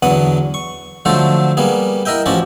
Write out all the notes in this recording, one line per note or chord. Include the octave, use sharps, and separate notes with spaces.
E2 D3 F#3 B3 F#5 D#6
C#6
D3 F3 F#3 A3 A4 C5
G3 A#3 B3 G#4
E4 A#4 D#5 E5 G5
A1 F3 C#4 F#4 G4 D5